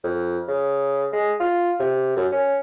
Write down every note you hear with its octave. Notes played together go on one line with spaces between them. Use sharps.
F2
C#3
G#3
F4
C3
F#2
C#4